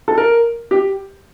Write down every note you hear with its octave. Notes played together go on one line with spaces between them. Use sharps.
A4
A#4
G4